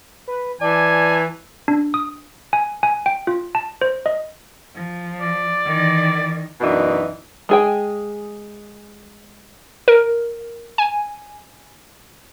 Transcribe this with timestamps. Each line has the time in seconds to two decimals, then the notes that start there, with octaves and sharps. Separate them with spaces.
0.28 B4
0.61 E3 D5 G#5 A5
1.68 D4
1.94 D#6
2.53 G#5
2.83 G#5
3.06 G5
3.27 F4
3.55 A5
3.81 C5
4.06 D#5
4.75 F3
5.21 D5
5.66 D#3 E3
6.61 F#2 B2 E3 D4 D#4
7.49 G#3 G#4 G5
9.88 A#4
10.78 G#5